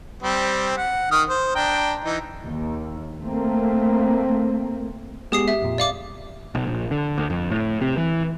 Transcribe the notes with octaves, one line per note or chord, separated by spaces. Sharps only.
G3 C4
F#5
D#3 D#6 F6
C5
D4 G5 A#5
E3 D#4
D#2
A3 A#3 C4
G#3 B3 G4 G#4 D#6 C7
E5
F2 A#2
D5 F5 D6
B1
A#1
D3
D2
F2
A2
C3
E3